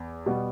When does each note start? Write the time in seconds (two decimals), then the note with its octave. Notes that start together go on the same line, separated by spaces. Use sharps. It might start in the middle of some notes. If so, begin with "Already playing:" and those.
Already playing: E2
0.26 B2 G3 B3